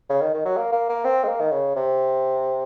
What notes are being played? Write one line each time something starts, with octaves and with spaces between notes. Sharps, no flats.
C#3
D#3
D#3
F#3
A#3
A#3
A#3
C4
G#3
A#3
D#3
C#3
C3